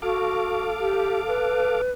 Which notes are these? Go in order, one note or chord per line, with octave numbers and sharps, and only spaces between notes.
F#4 A4 F5 D6
G4
B4